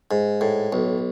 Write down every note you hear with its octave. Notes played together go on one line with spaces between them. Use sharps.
G#2
A2
B1